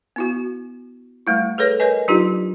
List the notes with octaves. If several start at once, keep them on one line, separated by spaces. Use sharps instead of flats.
B3 E4 F#4
G3 A3 E4
G#4 A4 B4 C#5
A#4 B4 C#5 D#5 G#5
F#3 D4 D#4 F4 G4